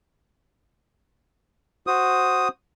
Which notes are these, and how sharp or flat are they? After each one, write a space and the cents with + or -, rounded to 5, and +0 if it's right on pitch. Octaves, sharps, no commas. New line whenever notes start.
F#4 +0 C5 +0 D#6 +0